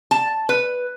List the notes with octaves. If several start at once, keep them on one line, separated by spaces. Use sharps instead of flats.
A5
B4